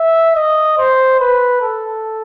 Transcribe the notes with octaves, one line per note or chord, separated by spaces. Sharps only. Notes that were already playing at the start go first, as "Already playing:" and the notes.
Already playing: E5
D#5
C5
B4
A4